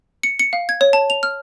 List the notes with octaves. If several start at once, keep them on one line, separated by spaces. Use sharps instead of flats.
C#7
C#7
F5
G#6
C#5
A5
F7
F6